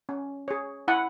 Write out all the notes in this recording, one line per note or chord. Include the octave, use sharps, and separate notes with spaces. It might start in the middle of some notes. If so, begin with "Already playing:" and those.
C#4
G#4 C#5
E4 F#5